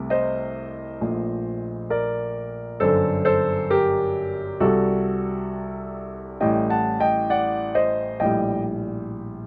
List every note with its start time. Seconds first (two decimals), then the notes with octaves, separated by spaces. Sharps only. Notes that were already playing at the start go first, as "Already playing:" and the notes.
Already playing: C2 C3 A3
0.10 C5 D#5
1.01 A#1 A#2 A3
1.90 A#4 D5
2.80 G1 F#2 D3 A4 C5
3.25 A4 C5
3.70 G4 A#4
4.60 C2 C3 G3 F#4 A4
6.41 A1 A2 G3 D#5 G5
6.70 F#5 A5
7.00 D#5 G5
7.30 D5 F#5
7.75 C5 D#5
8.20 A#1 A2 G3 D#5 G5